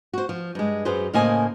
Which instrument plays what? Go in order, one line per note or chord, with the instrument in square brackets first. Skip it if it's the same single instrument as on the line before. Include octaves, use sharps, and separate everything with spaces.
[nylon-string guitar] F#4 C5
F3
G2 G#3
F#2 F#3 G#4 B4 C5
A2 C#3 A#3 C5 D#5 G#5